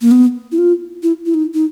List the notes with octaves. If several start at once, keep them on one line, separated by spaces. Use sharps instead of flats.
A#3
B3
E4
F4
E4
E4
D#4
D#4